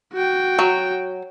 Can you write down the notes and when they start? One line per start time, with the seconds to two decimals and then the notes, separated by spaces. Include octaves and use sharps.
0.13 F#4 G5
0.59 F#3